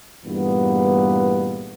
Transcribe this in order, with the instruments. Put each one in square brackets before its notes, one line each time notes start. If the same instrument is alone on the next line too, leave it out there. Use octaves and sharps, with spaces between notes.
[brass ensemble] E2 G2 A#2 E3 A3 B3